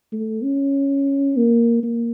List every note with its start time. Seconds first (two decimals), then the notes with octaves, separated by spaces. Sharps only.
0.12 A3
0.43 C#4
1.37 A#3
1.83 A#3